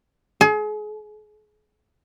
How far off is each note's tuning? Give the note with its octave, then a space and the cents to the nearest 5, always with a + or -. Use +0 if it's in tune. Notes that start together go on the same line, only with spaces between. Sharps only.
G#4 +35